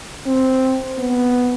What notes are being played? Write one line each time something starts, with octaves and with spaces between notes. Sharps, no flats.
C4
B3